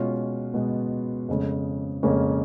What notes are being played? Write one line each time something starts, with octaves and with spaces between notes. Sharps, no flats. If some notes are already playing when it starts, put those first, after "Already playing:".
Already playing: B2 G#3 C#4 F4
B2 G#3 B3
F2 C#3 G#3
F2 C#3 G#3 A#3 C#4